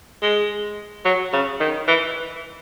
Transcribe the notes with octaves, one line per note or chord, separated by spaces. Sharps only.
G#3
F#3
C#3
D#3
E3